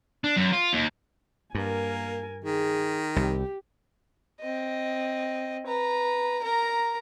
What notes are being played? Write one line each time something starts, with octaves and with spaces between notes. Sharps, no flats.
D4
F#2
F4
D#2
G2 A#3 A#4 G#5
D#3 G#4
C2 G4
C4 D#5
B4 A#5
A#4 A#5